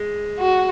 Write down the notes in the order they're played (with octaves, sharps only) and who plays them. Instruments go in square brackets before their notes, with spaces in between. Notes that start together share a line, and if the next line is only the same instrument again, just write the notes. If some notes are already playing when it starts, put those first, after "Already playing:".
Already playing: [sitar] G#3
[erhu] F#4